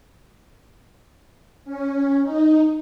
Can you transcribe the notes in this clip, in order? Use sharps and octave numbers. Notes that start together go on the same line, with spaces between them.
C#4
D#4